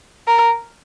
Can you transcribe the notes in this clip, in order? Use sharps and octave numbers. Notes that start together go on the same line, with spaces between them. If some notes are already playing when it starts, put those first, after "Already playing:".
A#4